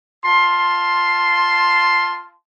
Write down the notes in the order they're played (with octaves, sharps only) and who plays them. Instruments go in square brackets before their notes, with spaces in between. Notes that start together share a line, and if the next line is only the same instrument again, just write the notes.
[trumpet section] F4 A5 C6